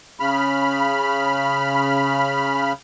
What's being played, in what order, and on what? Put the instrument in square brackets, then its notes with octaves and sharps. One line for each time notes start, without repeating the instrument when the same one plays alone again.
[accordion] C#3 B5 F6